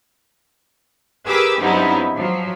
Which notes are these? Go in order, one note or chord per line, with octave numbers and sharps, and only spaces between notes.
G4 G#4 A#4 B4 D6 E6
G2 C3 F#3 B3 D#4 E4
F3 F#3